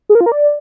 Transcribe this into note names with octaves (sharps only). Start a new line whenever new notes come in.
G#4
A#4
F4
A#4
D5